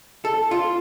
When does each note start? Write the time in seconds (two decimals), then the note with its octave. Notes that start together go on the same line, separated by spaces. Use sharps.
0.25 A4
0.51 F4